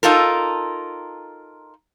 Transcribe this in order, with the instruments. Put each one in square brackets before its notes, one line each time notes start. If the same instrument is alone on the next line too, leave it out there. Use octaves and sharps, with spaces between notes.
[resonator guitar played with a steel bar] D#4 F4 A4 A#4